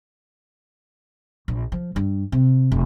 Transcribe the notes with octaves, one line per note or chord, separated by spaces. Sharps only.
A#1
F3
G2
C3
F1